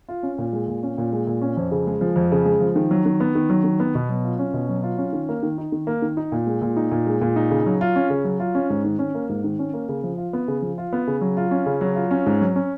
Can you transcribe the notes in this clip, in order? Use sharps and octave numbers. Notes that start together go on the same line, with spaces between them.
F4
C#4
A#2
G#3
A#2
C#4
A#2
G#3
A#2
C#4
F2
C#3
G#3
F3
F2
C#3
G#3
F3
D#3
F#3
D#3
B3
D#3
F#3
D#3
B3
B2
F#3
F4
C#4
B2
F#3
F4
C#4
D#3
A#3
D#3
D#4
D#3
A#3
D#3
D#4
A#2
G#3
A#2
D#4
A#2
G#3
A#2
D#4
C#3
F#3
F4
C#4
C#3
F#3
F4
C#4
G#2
D#3
C#4
A#3
G#2
D#3
C#4
A#3
C#3
F3
F4
B3
C#3
F3
F4
B3
C#3
F#3
F4
C#4
C#3
F#3
F4
C#4
G#2
F#3
C#4